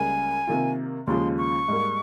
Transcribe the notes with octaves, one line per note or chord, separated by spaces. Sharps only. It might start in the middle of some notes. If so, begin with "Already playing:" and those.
Already playing: C#2 C#3 G3 A#3 G#5
C3 D#3 A#3 F4
D#2 C#3 F3 G#3 C6
C#6
G#2 G3 A#3